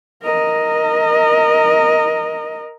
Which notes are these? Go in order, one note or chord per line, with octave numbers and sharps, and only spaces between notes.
A#4 D#5